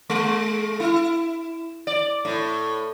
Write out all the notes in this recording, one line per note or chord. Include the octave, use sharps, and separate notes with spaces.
G#3
E4
D5
A2